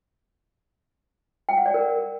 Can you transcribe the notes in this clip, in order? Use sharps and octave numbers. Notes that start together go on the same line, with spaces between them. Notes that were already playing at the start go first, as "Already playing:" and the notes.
G5
F#5
D5
A#4